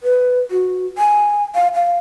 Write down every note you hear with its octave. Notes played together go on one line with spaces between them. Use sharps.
B4
F#4
G#5
F5
F5